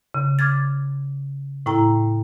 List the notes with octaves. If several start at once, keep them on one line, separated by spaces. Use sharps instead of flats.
C#3
D6 F6 G#6 A6
A2 E4 G5 A#5